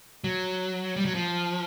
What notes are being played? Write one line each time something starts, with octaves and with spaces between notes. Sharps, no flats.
F#3
G3
F#3
F3